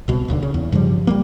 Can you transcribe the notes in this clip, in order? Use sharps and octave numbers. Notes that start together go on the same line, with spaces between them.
C2 B2
D#1 D#2 D3
C#3
E2
G2 C#3 F3 G3
G3 A3 A#3